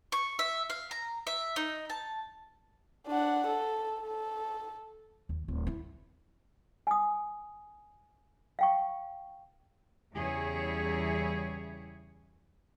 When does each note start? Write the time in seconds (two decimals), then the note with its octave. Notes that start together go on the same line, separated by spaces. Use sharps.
0.12 C#6
0.39 E5
0.70 F5
0.91 A#5
1.27 E5
1.56 D#4
1.90 A5
3.07 D4 F#5
3.47 A4
4.01 A4
5.29 D#2
5.48 D1
5.67 E4
6.87 G#5 D#6
8.59 F5 G5 C#6
10.14 E2 C#3 G3 E4 G#4 C#5